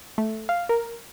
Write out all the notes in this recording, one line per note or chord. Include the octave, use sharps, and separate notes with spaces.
A3
F5
A#4